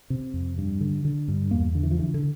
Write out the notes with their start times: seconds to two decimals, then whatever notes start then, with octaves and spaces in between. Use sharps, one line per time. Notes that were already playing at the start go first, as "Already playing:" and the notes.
0.10 C3
0.34 F2
0.58 G2
0.81 D3
1.05 D3
1.28 G2
1.51 E2 A#3
1.75 D3
1.83 E3
1.91 F3
1.98 D3 E3
2.14 D3